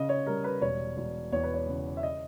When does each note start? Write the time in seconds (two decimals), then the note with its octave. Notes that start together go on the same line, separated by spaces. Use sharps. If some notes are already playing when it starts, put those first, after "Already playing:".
Already playing: C#3 D#5
0.09 C#5
0.27 G3 A#4
0.44 B4
0.61 E1 C#5
0.97 E1
1.32 E2 C#5
1.44 B4
1.54 C#5
1.68 C#3
1.97 E5
2.03 D#5